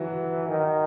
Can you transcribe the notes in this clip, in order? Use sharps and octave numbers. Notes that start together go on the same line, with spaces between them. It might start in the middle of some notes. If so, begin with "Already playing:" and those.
Already playing: E3 F#3 F#4
D#3